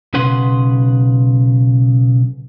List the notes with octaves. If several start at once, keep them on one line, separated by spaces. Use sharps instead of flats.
B1 C#3 B4 F#5 C6